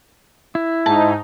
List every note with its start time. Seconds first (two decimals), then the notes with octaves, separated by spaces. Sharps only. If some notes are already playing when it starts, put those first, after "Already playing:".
0.55 E4
0.86 G#2 D#4 A5